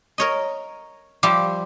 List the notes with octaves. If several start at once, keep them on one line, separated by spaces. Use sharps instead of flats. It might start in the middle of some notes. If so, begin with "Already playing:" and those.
A#4 C#5 D#5
F3 G3 G4 C5 E5